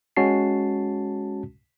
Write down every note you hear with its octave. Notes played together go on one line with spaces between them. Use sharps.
G#3 C#4 F#4 A5 C7